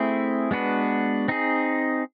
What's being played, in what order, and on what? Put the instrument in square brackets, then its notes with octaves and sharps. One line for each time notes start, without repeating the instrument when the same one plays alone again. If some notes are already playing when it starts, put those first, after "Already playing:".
Already playing: [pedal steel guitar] A3 C4 E4 G#4
G#3 B3 D4 F#4 B4
C4 D#4 G#4